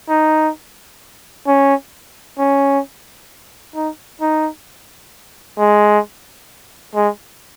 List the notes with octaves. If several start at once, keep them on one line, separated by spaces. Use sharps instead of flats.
D#4
C#4
C#4
D#4
D#4
G#3
G#3